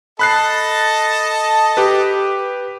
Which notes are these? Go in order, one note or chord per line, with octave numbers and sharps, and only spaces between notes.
A4 D#5 A5 B5 F#6 C7
G4 B4